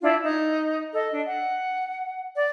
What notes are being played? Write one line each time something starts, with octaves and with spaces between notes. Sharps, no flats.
D4 E4 F4
D#4
A4 D#5
D4
F#5
D5